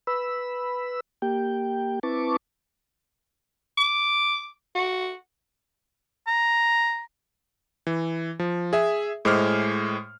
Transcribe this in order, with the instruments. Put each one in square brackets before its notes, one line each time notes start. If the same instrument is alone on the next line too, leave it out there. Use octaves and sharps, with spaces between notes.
[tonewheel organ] B4 B5 E6
A#3 G4 G5
C4 E4 B4 A5 C#6 D6
[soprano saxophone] D6
F#4
[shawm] A#5
[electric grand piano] E3
F3
G#4 E5
A2 G#3 C5 D6 F6